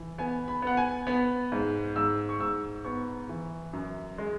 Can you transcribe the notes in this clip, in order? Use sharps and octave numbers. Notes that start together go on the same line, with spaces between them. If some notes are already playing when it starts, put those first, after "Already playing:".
Already playing: E3
B3 G#5
B5
B3 F#5
G#5
B3 B5
G#2
G#2 E6
C#6
G#2 E6
B3 C#6
E3
F#2
G#3